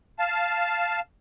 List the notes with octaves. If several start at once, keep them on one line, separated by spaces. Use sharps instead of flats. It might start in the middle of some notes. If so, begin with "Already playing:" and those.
F5 A5